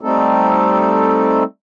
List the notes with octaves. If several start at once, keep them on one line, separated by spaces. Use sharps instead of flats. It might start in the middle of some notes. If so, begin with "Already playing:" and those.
G3 A3 C4 D#4 A4